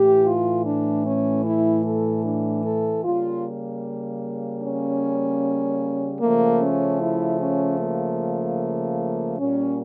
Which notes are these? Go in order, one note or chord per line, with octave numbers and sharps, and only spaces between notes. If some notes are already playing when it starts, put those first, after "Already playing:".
Already playing: A2 E3 A3 G4
F4
D4
C#4
E4
A4
D4
A4
C#3 G3 A#3 F4
C#4
C#3 F3 A3 A#3
C#4
E4
C#4
A#3
A#2 G3 A#3 C#4